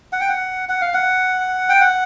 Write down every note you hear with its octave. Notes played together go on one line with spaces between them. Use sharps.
F#5
G5
F#5
F#5
F5
F#5
G5
F#5